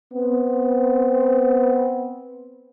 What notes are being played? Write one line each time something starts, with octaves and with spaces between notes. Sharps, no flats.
B3 C4